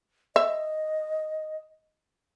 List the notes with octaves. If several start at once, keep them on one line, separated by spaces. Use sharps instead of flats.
D#5 E5